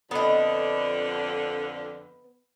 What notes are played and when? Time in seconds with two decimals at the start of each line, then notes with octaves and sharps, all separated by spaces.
0.11 F2 D3 B3 D#5